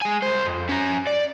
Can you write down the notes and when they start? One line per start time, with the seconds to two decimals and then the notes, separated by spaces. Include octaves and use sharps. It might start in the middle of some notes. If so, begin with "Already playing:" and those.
0.02 G#3 G#5
0.23 C2 C5
0.45 F2
0.69 C#4 A#5
1.07 D5